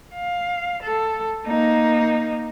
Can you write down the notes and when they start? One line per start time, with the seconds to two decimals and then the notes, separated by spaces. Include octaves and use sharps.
0.15 F5
0.82 A4
1.46 A#3 D#4